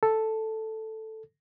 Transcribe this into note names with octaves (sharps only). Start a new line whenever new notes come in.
A4